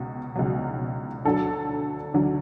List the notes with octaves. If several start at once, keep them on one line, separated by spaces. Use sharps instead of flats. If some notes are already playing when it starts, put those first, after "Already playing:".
Already playing: C#2 B2
C#2 B2 F#3
D2 D3 F#3 A4
D2 D3 F#3